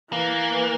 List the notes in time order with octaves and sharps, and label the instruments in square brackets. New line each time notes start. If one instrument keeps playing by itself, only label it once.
[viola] E3 [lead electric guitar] A#3